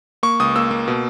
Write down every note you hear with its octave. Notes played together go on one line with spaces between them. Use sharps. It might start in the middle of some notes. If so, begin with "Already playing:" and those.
A#3 C#6
C#2 D#6
A#3 E6
A#3
B2